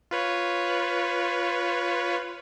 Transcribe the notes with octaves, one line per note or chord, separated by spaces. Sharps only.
F4 B4 C#5